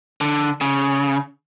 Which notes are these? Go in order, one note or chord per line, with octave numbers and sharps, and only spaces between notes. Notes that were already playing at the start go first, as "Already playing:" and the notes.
D3
C#3